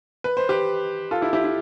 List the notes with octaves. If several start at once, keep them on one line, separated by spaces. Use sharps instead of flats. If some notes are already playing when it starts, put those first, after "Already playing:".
B4
C5
G4 B4
F4 A4
E4 G4
E4 G4
E4